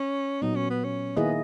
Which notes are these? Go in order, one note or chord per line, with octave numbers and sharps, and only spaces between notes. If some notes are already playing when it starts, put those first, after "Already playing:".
Already playing: C#4
A#2 F#3 B3 D#4
C#4
B3
C#4
D#3 A#3 B3 E4 G#4 D#5